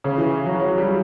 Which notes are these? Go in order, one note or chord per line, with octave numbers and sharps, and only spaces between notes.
C#3
E3
F#3
F#3
G3